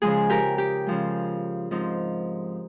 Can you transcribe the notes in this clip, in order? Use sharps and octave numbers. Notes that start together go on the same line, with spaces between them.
C#3 F3 G#3 G#4
G4 A#4
G4
C#3 F3 G#3
G#2 F3 C4 D#4